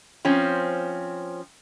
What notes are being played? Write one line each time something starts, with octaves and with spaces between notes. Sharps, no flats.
F3 C4 C#4